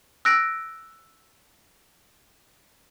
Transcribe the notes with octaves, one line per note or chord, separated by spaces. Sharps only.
E6 F#6 A#6 D7